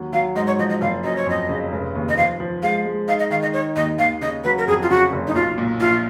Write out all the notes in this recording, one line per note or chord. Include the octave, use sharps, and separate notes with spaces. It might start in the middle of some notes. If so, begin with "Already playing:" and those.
Already playing: D#2 F#3
F#3 F5
G#2 D#5
C#5
F3 D#5
D#5
F#1 F5
F#2 D#5
C#5
F2 D#5
C#3
F1
D#2
D#5
F3 F5
F3
G#3 F5
G#3
D#4 F5
D#5
D#3 F5
D#5
D#4 C#5
D#2 D#5
D#2 F5
C#3 D#5
F#3 B4
A#4
F2 G#4
F4
C#3 F#4
F#1
D#4
B1 F4
A#2
A#1 F4